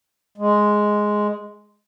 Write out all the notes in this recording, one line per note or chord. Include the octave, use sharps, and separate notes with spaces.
G#3